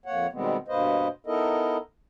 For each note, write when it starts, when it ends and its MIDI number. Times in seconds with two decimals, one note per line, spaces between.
0.06 0.27 41
0.06 0.27 58
0.06 0.27 73
0.06 0.27 78
0.33 0.57 47
0.33 0.57 51
0.33 0.57 55
0.33 0.57 56
0.33 0.57 59
0.33 0.57 60
0.68 1.08 43
0.68 1.08 47
0.68 1.08 58
0.68 1.08 71
0.68 1.08 72
0.68 1.08 75
1.27 1.78 59
1.27 1.78 63
1.27 1.78 64
1.27 1.78 69
1.27 1.78 70
1.27 1.78 75